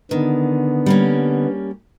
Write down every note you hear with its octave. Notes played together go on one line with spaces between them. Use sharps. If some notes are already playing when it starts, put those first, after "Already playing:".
D3 D#3 B3
G3 A#3 C#4